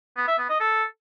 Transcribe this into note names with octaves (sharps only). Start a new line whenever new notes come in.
B3
E5
B3
D#5
A4